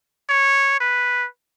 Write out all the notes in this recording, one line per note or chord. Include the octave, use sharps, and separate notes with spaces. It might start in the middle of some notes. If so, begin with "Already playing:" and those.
C#5
B4